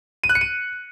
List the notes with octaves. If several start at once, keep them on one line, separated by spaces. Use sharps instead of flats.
D#7
F#6
C#7
D#7